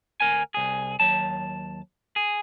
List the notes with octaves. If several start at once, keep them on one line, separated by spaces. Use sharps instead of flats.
D2 A#4 G#5
C2 G#4
D#2 F#3 A5
G#4